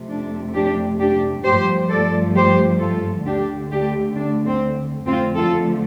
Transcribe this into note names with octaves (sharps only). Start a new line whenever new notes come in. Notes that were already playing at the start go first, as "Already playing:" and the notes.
Already playing: F2 C3 A3
D4
D4 G4
D4 G4
G2 F3 A3 G4 C5
A4 D5
G4 C5
F4 A4
D2 D3 A3 D4 G4
D4 G4
D4
C4
F2 D3 F3 A3 C4 F4
F4 A4